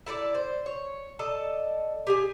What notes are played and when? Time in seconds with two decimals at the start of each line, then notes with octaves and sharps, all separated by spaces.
0.06 E4 A4 B4 D5
0.35 C5
0.66 C#5
1.19 A4 D5 D#5 A5
2.07 G4 G#4 G#5